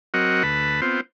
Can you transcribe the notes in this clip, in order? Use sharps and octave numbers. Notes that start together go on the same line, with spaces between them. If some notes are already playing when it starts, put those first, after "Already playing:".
F#3 C4 F#4 A#4 D#5 F#5
D2 B4 A5 B5
B3 C4 F4 C5